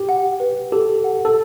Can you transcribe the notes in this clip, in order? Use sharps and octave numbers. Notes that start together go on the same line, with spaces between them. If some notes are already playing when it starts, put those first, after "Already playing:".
Already playing: G4
F#5
B4
G4 A4
F#5
A4